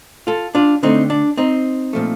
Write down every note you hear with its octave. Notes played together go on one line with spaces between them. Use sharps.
F4 A4
D4 F4
D3 A3 C4 D#4
D4
C4 D#4
A#2 F3 A3